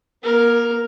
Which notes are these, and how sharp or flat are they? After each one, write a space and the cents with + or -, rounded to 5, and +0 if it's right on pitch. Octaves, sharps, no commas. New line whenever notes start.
A#3 +35 A#4 +0